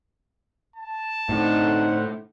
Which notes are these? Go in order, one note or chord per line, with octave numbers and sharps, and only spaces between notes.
A5
A2 D3 C4 D4 D#4 C5 F#5